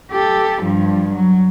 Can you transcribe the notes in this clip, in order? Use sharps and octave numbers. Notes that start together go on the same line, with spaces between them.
G4 A4
G2 F3
F#3